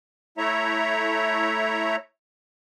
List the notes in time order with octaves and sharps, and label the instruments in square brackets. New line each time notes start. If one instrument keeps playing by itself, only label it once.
[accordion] A3 E4 C#5 E5 A#5